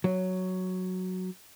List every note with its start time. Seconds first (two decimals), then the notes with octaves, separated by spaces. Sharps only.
0.04 F#3